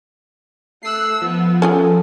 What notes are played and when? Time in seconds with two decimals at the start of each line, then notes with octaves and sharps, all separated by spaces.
0.83 A3 E6 F#6 C7
1.22 F3 B3
1.62 C#4 F4 G#4 A4